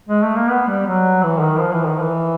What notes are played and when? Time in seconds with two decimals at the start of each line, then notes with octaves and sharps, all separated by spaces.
0.09 G#3
0.23 A3
0.37 A#3
0.50 B3
0.68 G3
0.87 F#3
1.23 E3
1.41 D#3
1.60 F3
1.73 E3
1.87 D#3
2.00 E3